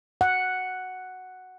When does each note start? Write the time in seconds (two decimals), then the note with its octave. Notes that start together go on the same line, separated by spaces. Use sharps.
0.21 F#5